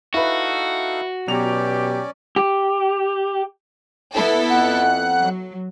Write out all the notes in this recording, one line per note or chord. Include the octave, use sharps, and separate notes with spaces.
D#4 E4 F#4 A4 B4 F5
B2 F#3 C#4 G4 D5 F7
G4
B3 E4 A4
F2 F#5 F#6
F#3